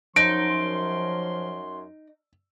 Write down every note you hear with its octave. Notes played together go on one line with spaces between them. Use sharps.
F#2 F3 D#4 C6 D7